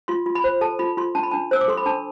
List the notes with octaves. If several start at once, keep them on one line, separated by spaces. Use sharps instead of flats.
F4 C6
F4
B5
C5
A4 A5
F4 B5
F4 C6
D4 A5
B5
D4 A5
C5 E6
D6
A4 C6
B5
D4 A5